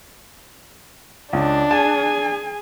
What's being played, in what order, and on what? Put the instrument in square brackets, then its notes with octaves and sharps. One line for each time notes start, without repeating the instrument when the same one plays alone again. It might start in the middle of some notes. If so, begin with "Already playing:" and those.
[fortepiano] C#2 [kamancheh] D4
[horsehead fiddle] G#4 G#5 [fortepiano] A5